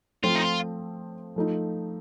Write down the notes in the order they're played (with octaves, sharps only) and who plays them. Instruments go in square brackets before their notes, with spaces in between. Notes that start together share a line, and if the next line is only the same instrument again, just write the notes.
[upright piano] F3 A3 C4 [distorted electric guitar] F4
[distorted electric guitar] D#4
F4
[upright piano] F3 A3 D#4